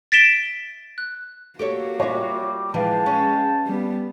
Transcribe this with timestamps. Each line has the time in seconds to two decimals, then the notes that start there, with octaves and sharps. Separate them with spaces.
0.12 A6 B6 D7 E7 G7
0.98 F#6
1.59 A#3 F#4 G4 A4 C#5
2.00 G3 F4 C#5 E5 D6 A#6
2.74 E3 F3 G#3 B4 F5 G5 A5
3.06 C#4
3.66 G3 B3